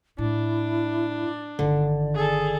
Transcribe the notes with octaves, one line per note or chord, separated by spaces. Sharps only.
A2 D4 E4
G1 D3 D#3 D5
G#4 A4